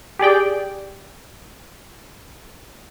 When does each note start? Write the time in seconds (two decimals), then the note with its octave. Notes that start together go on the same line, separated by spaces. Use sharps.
0.19 G4 G#4 D5 G5